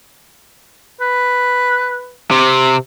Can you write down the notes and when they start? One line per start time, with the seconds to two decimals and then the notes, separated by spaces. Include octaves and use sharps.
1.01 B4
2.31 C3